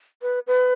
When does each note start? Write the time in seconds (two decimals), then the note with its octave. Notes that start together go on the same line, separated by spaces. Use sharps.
0.22 B4
0.47 B4